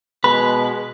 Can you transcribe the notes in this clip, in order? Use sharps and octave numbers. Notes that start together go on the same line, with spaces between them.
B2 G#3 B4 B5